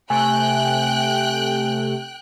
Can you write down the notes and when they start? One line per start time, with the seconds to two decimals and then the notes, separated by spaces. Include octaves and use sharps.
0.10 C3 A3 G5 G#5 F#6